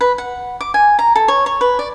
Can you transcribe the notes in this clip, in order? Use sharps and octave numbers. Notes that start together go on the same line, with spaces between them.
B4
F#5
D6
G#5
A#5
A4
C#5
C#5
B4
D5